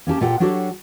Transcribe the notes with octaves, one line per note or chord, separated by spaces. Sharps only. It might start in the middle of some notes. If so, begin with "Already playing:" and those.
A#3 C#4 G4 A5
A#2 F4 G4 A4 F#5 G5
F#3 D4 F#4 G4 A4 C#5